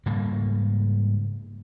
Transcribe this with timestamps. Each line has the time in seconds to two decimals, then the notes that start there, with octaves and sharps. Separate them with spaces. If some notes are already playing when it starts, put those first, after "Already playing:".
0.06 G#2 C#3 G3 A#3